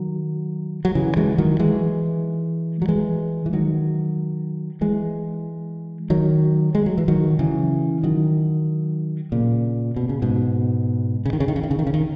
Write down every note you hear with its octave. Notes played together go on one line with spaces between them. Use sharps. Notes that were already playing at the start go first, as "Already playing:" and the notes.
Already playing: D#3 F#3
F#3
C#3 E3
E3 G#3
D#3 F#3
E3 G#3
F#3
E3 G#3
E3
D#3 F#3
E3 G#3
D#3 F#3
G#3
F#3
E3
D#3 F#3
C#3 E3
D#3 F#3
A#2 C#3
B2
C#3
G#2 B2
C#3
D#3
C#3
D#3
C#3
D#3
C#3
D#3
C#3
D#3